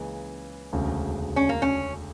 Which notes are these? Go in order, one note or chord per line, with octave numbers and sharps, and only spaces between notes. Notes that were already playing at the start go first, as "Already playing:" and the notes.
Already playing: C#2 C#3 E3 A#3
E1 D2 C#3
C#4
A#3
C#4